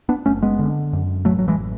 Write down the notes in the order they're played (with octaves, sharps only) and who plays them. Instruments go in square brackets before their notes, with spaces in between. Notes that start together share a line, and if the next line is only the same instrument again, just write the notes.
[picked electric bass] B3 D4
F#1 A3 C#4
G#3 B3
D3
F#2
A1 F#3 A3
F#3
E3 G#3